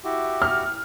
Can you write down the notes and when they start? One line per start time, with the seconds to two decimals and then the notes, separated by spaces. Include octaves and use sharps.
0.04 E4 F#4 G4
0.42 F6